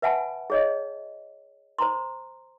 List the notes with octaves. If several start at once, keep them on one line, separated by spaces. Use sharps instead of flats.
B4 E5 F#5 G#5 A5 B5
G#4 C#5 D#5
C5 A#5 C6